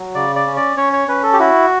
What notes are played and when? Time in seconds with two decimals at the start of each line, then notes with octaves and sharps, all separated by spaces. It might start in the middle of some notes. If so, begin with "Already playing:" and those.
Already playing: F#3
0.15 C#3 D5
0.36 D5
0.46 C#4
0.57 D5
0.77 C#4 C#5
0.93 C#5
1.08 C#4 B4
1.23 A4
1.33 G4
1.39 E4 F#4